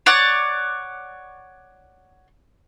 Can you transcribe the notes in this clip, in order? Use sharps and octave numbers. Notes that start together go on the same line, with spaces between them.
C#5 D5 F#5